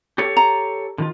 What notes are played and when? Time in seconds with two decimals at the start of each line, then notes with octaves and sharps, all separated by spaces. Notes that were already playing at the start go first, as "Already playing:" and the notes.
0.18 G4 A4 C#5
0.37 A#5
0.98 D3 D#3 F4